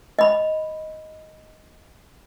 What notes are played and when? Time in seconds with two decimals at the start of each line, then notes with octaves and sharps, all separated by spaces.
0.19 D#5 B5